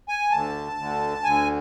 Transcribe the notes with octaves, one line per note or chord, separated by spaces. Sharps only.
G#5
D2 D3 A5
D2 D3
D2 D3 G#5